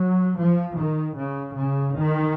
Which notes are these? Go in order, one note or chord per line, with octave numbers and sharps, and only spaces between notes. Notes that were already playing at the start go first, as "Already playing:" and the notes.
Already playing: F#3
F3
D#3
C#3
C#3
D#3